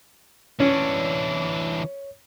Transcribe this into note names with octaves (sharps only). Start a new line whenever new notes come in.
E3 C#4 D4 C#5